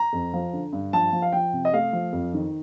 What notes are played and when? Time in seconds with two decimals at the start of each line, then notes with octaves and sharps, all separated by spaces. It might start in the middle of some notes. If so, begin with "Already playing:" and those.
Already playing: A#5
0.13 F2
0.33 F3
0.53 D3
0.72 G2
0.93 F3 A5
1.13 F3
1.22 F5
1.32 F3 G5
1.53 C3
1.65 D#5
1.73 A3 F5
1.93 F3
2.13 F2
2.34 D#3